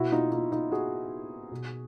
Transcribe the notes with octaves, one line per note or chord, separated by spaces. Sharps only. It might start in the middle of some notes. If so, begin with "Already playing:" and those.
Already playing: B2 E4 F#4
D#4 F4
D#4 F4
D#4 F4
F#4 G#4
B2